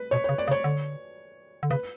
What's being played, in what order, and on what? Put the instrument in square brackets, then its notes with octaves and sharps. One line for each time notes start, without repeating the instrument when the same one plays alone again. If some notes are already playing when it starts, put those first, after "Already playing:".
Already playing: [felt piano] B4
[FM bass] B2 [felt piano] C#5
[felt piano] C#5
[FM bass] C#3
[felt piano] D5
[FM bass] C#3
[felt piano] C#5
[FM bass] D3
D3
[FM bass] C#3 [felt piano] B4